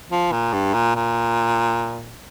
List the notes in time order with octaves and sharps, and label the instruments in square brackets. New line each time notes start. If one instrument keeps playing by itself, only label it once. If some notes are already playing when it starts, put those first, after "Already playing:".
[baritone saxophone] F3
A#2
G2
A#2
A#2